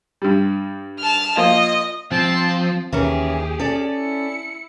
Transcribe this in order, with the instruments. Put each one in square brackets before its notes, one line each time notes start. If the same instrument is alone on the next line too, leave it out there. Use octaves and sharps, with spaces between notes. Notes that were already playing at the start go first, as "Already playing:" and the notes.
[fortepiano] G2 G3
[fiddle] A5 F6
[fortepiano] F3 A#3 F4 [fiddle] D#5
[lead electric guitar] F3 [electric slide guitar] C4 [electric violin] C5 A5
[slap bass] D#2 [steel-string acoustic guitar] E3 C#4 A#4 [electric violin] G4 G#4
[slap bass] C#4 [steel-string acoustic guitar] A4 D5
[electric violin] E4 C#7